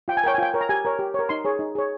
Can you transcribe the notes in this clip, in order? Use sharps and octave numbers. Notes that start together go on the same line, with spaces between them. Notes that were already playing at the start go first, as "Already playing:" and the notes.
F4 G5
G#5
A#4 C#5 G5
G#5
F4 G5
A#4 C#5
A#5
G4 G#5
A#4 C#5
G4
A#4 C#5
D#4 C6
G#4 C#5
D#4
G#4 C#5